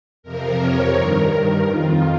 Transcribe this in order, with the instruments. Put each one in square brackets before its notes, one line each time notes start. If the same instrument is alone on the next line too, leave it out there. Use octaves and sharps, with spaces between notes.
[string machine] F2 C3 F3 A#4
C#5
G2 D#3 A#4
F2 D#3 F4